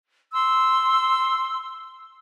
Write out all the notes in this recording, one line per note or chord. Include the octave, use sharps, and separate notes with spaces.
C6 E6